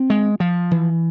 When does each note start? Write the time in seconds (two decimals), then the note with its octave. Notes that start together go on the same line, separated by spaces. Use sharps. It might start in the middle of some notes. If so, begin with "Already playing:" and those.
Already playing: C4
0.10 G#3
0.40 F3
0.71 E3